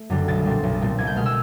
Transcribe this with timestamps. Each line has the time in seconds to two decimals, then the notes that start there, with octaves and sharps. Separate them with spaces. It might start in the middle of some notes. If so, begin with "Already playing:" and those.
Already playing: A3
0.10 F#2 D3 G3
0.28 B1 A6
0.45 A#2 G3 C4
0.63 B1
0.81 A#2 G3 C4
0.99 C2 G#6
1.07 G6
1.16 B2 G#3 F6
1.26 E6